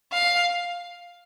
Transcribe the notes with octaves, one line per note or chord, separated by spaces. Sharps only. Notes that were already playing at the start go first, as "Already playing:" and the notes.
F5